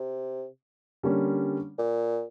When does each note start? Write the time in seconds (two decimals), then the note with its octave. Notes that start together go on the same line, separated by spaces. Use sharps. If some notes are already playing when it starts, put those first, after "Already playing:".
Already playing: C3
1.03 D3 G3 A#3 C#4
1.78 A#2